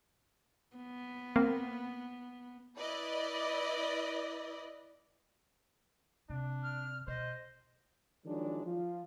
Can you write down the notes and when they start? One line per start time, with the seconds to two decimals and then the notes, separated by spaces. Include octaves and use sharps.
0.77 B3
1.36 A#3 C4
2.77 E4 B4 D5 D#5
6.30 C3 D4
6.63 F6
7.07 B2 C5 D#5
8.25 D#3 F3 F#3 G#3 D4
8.65 F3 F4